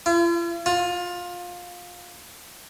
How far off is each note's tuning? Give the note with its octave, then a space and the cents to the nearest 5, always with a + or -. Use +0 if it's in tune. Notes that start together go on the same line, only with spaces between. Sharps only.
F4 -45
F4 +20